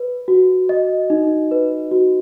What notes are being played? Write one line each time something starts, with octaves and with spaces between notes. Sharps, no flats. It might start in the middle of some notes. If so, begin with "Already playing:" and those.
Already playing: B4
F#4
D#5
D#4
B4
F#4